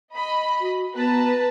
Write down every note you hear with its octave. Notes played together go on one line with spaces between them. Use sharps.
D#5 B5
F#4
B3 B4 A5 A#5